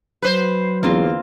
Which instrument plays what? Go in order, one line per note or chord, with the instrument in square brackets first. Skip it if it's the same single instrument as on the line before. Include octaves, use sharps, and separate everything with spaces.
[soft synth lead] F#3 [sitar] B4 C5
[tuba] E2 [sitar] D3 [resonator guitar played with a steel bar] A#3 C4 F4